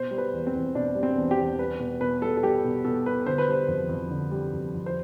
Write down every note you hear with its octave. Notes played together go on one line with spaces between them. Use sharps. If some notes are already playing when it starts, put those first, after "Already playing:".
Already playing: B2 C5
G3
B4
E2
C4
E2
B2 D4
G3
C4
E2
G4
E2
G3 B4
B2
B2 B4
G3 A4
A4
G3 G4
B2
B2 A4
G3 B4
D3 C5
B4
G3 C5
F2
F2
D3
G3
F2
F2
C5